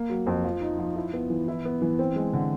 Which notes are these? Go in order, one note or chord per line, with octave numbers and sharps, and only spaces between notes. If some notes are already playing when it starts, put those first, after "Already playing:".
Already playing: A#3
F#3
F2
F3
D#4
F3
E4
B3
E3
E4
B3
E3
C4
G#3
D3